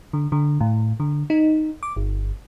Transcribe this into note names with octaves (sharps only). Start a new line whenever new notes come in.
D3
D3
A2
D3
D#4
D6
G1